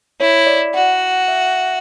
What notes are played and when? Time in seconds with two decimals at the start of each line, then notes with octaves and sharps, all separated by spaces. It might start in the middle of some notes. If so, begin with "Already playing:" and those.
0.20 E4 C#5
0.47 D5
0.74 F#4 F#5
1.28 E5